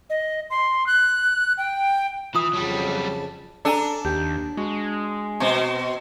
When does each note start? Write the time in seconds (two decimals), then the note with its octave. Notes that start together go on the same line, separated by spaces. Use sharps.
0.10 D#5
0.50 C6
0.87 F#6
1.58 G5
2.35 E3 F4 D#6
2.54 F2 C#3 F#3 G3 A5
3.65 D4 A4 G#5 A#5
4.05 D#2 G4
4.57 G#3 F#4
5.40 B2 C4